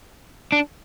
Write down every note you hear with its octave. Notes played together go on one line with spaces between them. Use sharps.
D4